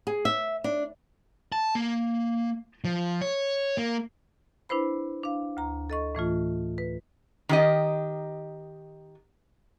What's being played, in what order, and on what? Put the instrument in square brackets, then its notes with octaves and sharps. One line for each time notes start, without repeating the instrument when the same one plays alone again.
[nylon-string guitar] G#4
E5
D4
[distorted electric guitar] A5
A#3
F3
C#5
A#3
[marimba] D4 E4 B4 C5 B5
D4 F5
D2 A#5
A4 D#5 C#6
A2 E3 A3 F4
B4
[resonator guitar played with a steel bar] D#3 G4 D#5